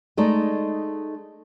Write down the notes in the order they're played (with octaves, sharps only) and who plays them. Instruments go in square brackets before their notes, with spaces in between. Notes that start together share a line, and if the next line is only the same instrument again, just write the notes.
[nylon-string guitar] G#3 A3 D#4 D5